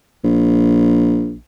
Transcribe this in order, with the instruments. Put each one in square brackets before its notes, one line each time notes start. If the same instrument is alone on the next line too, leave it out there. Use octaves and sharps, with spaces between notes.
[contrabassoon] A#1